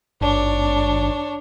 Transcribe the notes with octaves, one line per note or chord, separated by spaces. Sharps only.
G#1 G2 D4 C#5